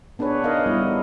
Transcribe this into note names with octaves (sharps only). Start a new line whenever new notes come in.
B3 D4 G#4 B4 C#5
D#4 A#4 D#5 F5
G3 B3 E4